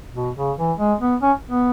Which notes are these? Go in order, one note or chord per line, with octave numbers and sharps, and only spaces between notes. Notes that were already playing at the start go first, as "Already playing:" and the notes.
B2
C#3
E3
G#3
B3
C#4
B3